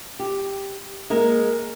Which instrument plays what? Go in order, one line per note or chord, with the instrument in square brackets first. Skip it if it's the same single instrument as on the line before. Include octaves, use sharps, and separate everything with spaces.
[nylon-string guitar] G4
G#3 A#3 A#4